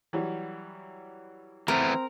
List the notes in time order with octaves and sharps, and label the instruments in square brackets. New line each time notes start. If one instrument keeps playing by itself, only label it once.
[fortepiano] E3 F#3 G3
[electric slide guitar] E3 A3 B3 [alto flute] C4 [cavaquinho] A#4